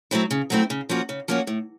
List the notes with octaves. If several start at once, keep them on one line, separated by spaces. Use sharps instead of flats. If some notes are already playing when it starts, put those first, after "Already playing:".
F#3 A3 C4 E4
C#3
F#3 A3 C4 E4
C#3
F3 A#3 C#4 F#4
C#3
F3 A#3 C#4 F#4
A2